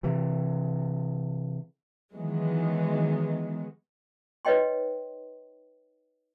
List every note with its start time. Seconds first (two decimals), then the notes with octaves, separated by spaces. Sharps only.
0.03 C3 E3
2.12 D#3 E3 F#3 G#3 B3
4.45 D#4 B4 C#5 D#5 G5 C6